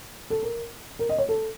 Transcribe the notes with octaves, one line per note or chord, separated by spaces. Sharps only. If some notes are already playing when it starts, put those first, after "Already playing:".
A4
A#4
A#4
D#5
C#5
A4